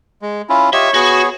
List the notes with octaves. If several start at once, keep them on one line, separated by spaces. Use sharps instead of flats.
G#3
C#4 E4 F4
F4 G4 C#5 D#5 E5
B3 F#4 G#4